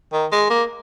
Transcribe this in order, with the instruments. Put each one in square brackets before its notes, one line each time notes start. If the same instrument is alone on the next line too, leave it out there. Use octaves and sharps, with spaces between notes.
[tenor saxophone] D#3
G#3
A#3